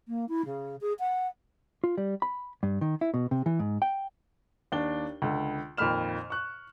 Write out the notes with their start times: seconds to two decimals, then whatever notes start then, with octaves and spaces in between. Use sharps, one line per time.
0.08 A#3
0.28 E4
0.45 C#3
0.81 G#4
0.99 F#5
1.84 F4
1.98 G3
2.22 B5
2.63 G2
2.81 D#3
3.01 E4
3.14 B2
3.31 C3
3.46 E3
3.59 G#2
3.82 G5
4.72 D#2 D4 G7
5.22 C#2 D3
5.77 F2 A#2 D#3 B5 F6 E7
6.30 C#6 F#6